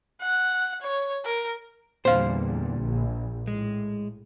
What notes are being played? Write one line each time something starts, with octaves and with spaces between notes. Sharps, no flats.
F#5
C#5
A#4
E2 A#2 D3 G3 C5 F5
A#1
A2 G#3